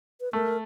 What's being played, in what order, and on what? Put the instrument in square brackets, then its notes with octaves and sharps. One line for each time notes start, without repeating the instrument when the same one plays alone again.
[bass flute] B4
[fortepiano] A3 [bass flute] A#4